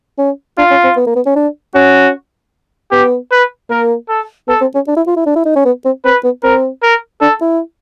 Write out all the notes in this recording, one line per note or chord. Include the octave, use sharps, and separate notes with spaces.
C#4
D4 F4
C#4
C4
B3
A#3
B3
C#4
D4
C#4 F#4
B3 G4
B4
A#3 A#4
A4
B3 A4
C4
C#4
D4
E4
F4
E4
D4
E4
D#4
C#4
B3
C4
C4 B4
B3
C4 A#4
A#4
D4 A4
E4